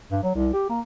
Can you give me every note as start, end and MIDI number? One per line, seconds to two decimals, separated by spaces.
0.11 0.21 43
0.23 0.32 54
0.35 0.53 36
0.53 0.65 67
0.69 0.80 58